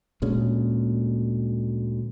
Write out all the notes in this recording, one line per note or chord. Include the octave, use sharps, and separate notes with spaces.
D2 A#2 G#3 C#4